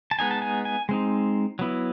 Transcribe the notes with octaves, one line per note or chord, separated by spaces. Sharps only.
A5
G#3 B3 D#4 G#5
A5
G#5
G#5
G#3 C4 D#4
F#3 B3 E4